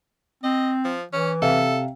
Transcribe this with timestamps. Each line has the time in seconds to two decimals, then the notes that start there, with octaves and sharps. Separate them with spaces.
0.43 C4 D#5
0.84 F3
1.13 E3 C#4
1.42 C3 A4 E5 F5